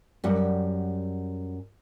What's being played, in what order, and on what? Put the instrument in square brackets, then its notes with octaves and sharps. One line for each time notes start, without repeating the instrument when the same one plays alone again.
[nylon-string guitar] F#2 G3 F#5